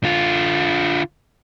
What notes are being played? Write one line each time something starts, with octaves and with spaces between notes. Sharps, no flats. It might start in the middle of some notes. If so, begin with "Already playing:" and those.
D3 F4